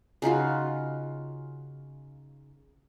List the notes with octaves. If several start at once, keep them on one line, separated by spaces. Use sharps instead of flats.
C#3 D#4 F4 F#4